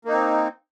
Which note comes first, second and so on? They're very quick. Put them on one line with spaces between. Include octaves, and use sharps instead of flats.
A#3 D#4 C4